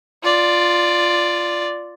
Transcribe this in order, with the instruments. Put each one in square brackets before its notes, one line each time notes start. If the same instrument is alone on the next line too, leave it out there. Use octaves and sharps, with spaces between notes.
[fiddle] F4 D5